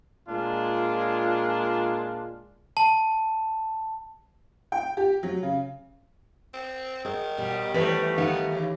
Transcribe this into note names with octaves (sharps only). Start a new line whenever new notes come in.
A#2 G#3 D4 F4
A5
G5
G4
F#3
C#3
C4
D#3 G#4
B2 G3
D#2 C3 G3 A3 B4 C#5
D#3 B3 F5
C#3 E3